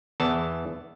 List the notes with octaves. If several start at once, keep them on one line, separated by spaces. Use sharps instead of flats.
E2 E3 A5